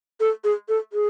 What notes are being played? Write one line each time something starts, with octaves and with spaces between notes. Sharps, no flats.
A4
G#4
A4
G#4